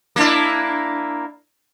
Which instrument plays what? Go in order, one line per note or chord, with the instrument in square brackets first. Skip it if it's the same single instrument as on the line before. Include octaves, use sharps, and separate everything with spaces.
[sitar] A#3 D4 E4